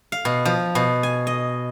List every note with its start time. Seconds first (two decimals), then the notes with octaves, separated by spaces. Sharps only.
0.12 F5
0.25 B2
0.45 F3
0.75 B2
1.03 G#5
1.27 D#5